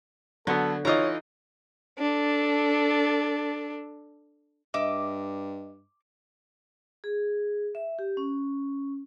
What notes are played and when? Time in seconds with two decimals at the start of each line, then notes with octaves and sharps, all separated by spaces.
0.47 D3 F#3 B3 A4
0.85 E3 D#4 F4 C#5 D#5 A#5
1.99 D4 A4
4.74 G2 D#5 E5 D6
7.04 G#4
7.75 E5
7.99 G4
8.17 C#4